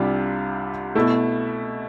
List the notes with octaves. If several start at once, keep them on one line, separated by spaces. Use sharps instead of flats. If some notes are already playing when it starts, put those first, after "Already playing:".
Already playing: C2 C3 G3 D4 F4
B2 A3 E4